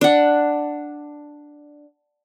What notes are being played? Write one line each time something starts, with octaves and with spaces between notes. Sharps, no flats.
D4 F#5